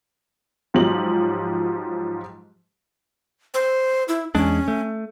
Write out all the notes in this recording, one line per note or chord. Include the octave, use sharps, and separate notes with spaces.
G#2 F3 F#3 G4 F#7
C5
E4
E2 G#3 C#4 D4
A3